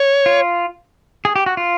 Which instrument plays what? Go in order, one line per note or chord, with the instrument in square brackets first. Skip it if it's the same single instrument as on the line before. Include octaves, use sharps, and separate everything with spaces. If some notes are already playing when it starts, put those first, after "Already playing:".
Already playing: [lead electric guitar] C#5
[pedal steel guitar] F4
G#4
G4
F#4
F4